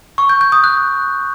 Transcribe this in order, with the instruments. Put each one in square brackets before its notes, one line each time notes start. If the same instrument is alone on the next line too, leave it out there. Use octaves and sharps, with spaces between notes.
[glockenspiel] C#6
G6
G6
D#6
F#6